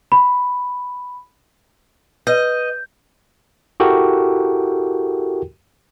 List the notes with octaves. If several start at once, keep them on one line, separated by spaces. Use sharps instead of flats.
B5
B4 D#5 G6
E4 F#4 G4 A4 A#4 G5